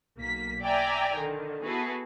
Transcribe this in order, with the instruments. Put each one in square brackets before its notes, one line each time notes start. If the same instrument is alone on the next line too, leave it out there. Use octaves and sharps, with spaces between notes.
[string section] B1 A#3 B6
D5 E5 G5 G#5 A#5
D3 D#3
B3 E4 F#4 G#4 A4 B4